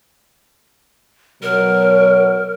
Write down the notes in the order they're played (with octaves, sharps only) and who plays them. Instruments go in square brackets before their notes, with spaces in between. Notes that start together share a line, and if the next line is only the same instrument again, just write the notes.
[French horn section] B2 F#3 [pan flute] A#4